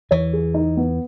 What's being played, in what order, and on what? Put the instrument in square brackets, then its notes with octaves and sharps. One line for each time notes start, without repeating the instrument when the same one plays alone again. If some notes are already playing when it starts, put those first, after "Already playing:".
[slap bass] E2 E3 [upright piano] C#5
[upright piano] G#4
D#4
B3